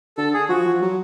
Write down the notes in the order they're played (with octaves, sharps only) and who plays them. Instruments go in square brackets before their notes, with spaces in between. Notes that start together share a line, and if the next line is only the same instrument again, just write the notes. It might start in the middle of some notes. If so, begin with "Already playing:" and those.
[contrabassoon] D3 [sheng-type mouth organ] A4
[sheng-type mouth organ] G#4
[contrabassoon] F3 [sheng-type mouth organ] F#4
[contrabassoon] F3
F#3